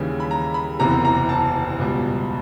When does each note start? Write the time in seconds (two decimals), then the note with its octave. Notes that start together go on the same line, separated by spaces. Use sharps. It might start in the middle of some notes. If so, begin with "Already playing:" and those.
Already playing: D#2 C#3 E3 G3
0.20 B5
0.31 A#5
0.54 B5
0.79 F#1 E2 C3 E3 A#5
1.05 A#5
1.29 A5
1.79 C#2 B2 G3